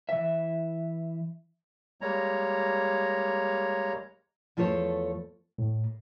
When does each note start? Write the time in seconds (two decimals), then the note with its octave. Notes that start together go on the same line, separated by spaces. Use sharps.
0.09 E3 E5
2.01 G3 G#3 A#3 C#5 A#5
4.57 E2 F3 A3 A4 C#5 A5
5.58 A2